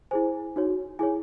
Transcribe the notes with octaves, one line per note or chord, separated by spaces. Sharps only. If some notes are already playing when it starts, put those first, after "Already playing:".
E4 G#4 C5 G#5
D#4 F#4 C#5
E4 G#4 C#5 G#5